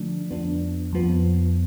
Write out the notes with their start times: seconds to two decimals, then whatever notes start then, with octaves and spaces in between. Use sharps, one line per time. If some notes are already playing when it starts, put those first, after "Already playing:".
Already playing: D3 F3 A3 D4
0.31 F2 F3 B3 D4
0.93 F2 F3 B3